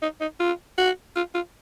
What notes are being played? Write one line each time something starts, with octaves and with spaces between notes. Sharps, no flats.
D#4
D#4
F4
F#4
F4
F4